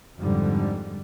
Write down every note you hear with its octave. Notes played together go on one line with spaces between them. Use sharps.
F2 G#2 D3 G3